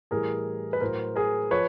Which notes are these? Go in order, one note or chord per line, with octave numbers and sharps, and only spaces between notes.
A2 E3 G3 G#4 A#4
B4
A2 F#3 A#4 C5
G#4 A#4
F3 B4 C#5